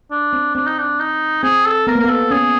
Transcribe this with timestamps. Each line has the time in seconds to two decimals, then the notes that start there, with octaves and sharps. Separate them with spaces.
0.11 D4
0.33 C4
0.55 C4 D4
0.66 D#4
0.78 D4
1.00 D#4
1.43 C4 G#4
1.65 A4
1.87 B3 A#4
1.95 A#3
2.00 A#4
2.04 B3 A4
2.31 C#4 G#4